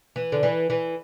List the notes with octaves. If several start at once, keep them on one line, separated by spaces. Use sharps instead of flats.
E3
D3
E3
E3